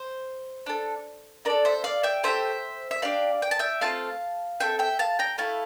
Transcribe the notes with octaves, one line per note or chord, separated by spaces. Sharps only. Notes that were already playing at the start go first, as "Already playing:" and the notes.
Already playing: C5
D4 A4
D4 A4 A#4 D5
C5 E5
D5 F5
E5 G5
A3 E4 G4 C5 E5
E5
D4 G4 D5 F5
G5
A5
E5 G5
A3 C4 F4 A4 F5 A5
C4 F4 A4 E5 G5
E5 G5
F5 A5
G5 A#5
A3 E4 A4 F5 A5